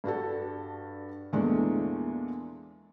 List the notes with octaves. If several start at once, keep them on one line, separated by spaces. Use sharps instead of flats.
G2 D4 F#4 A4
E2 A#2 E3 G#3 A3 D4